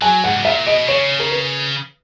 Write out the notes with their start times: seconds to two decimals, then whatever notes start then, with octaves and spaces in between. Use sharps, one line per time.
0.02 F#3 G#5
0.24 G#2 F#5
0.31 C#3
0.38 B2
0.45 A#2 E5
0.66 B2 D#5
0.88 C#3 C#5
1.20 A#4
1.31 B4